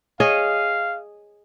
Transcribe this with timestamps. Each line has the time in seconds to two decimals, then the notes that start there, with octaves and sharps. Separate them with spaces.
0.20 G#4 C#5 D#5 F5